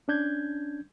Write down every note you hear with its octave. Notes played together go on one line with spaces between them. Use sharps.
C#4 D4 G6 G#6